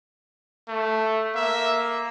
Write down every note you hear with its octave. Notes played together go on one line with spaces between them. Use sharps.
A3
A#3 E5